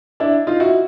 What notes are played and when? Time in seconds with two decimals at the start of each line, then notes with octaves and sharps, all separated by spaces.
0.20 D4 E4
0.47 D#4 F4
0.60 E4 F#4